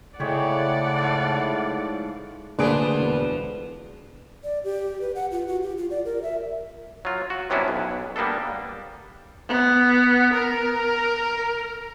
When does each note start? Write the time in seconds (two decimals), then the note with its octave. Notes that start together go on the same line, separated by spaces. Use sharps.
0.20 A2 C#3 G#3 G4 C#5 D5 F#5
0.99 G#2 F3
2.59 D2 F3 A#3 D4 G#4 B4 D5 D7
2.95 E1
4.44 D5
4.64 G4
5.01 B4
5.15 F#5
5.32 F4
5.47 F#4
5.63 G4
5.78 F4
5.90 D5
6.05 A#4
6.22 E5
7.05 F#3 F4
7.30 F#4
7.50 C3 F#3 B3 C#4 D4 E4
7.68 B1
8.16 G3 A#3 B3 D4 A4
9.49 B3
10.34 A#4